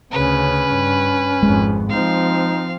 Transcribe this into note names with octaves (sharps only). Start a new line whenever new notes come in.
D2 C#3 C#4 B4
G2
G#1 F2 G#3
F3 C4 D#4 F5